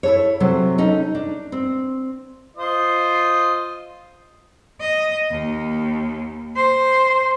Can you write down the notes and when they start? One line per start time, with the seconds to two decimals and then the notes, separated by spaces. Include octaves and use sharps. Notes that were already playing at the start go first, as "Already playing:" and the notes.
0.03 E4 A4 C#5
0.40 C3 F#3 A4 C5
0.78 C#4 D#4 A4
1.15 D4
1.52 C4
2.57 F4 C5 D#5
4.80 D#5
5.31 D#2
6.56 C5